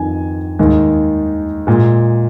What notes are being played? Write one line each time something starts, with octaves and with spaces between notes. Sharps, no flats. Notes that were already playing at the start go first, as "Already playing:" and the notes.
Already playing: F2 D#3 G#5
D#2 D#3 G#3
A#2 G#3